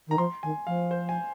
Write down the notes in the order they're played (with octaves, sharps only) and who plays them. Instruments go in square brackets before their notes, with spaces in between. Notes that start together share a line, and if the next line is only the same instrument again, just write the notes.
[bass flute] D#3 [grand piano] A#5
[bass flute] F3 [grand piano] C6
[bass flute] D#3 [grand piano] G#5
[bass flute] F3 [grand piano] F5
[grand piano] C5
G#5